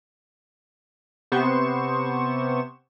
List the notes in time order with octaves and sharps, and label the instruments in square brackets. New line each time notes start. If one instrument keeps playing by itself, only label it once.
[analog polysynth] C3 B3 C5 C#6 E7